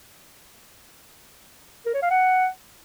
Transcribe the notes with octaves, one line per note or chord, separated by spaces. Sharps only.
A#4
C#5
F5
F#5